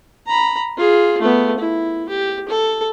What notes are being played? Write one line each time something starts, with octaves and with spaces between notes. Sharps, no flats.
A#5 B5
F4 G#4
A3 B3
E4
G4
A4